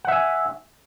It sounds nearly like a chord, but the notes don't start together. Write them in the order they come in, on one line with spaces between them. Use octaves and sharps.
F#5 E5 G#5